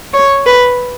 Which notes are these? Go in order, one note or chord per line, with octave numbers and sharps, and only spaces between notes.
C#5
B4